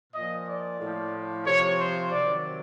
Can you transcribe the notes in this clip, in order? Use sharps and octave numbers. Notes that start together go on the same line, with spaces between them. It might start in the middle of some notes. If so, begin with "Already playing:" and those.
A#2 F3 D#5
D5
A2 F3
C3 F3 C#5
C5
C3 D#3 F#3 D5